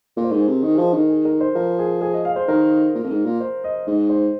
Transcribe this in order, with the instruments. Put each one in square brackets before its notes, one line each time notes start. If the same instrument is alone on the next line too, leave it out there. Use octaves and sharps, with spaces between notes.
[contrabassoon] A#2 [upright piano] A#4
[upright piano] C5
[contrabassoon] G#2 [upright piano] A#4
[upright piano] G#4
[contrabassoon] C3
[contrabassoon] D#3 [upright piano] D#5
[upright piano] G#4
[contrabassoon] F3
[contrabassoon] D#3 [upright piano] A#4
[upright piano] G#4
A#4
C5
[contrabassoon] F3 [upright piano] A#4
[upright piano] G#4
G#4
D#5
F5
C5
[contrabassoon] D#3 [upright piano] A#4
[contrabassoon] A#2
F2
G#2
A#2
[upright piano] C5
D#5
[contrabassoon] G#2 [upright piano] D#5
[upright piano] C5